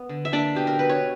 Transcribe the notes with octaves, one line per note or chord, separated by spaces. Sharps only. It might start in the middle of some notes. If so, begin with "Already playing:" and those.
Already playing: B3
D3
E5
A#3 D4 D5
B2 G4
A#4
B2 B4
C#5